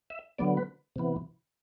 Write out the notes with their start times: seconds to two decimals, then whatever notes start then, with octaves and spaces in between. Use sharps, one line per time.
0.10 E5
0.39 D3 F#3 B3 D5
0.57 B4
0.96 C3 E3 B3